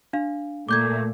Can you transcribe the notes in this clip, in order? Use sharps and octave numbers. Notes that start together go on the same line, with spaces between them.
D4 F5
A#2 A3 D6 G6 G#6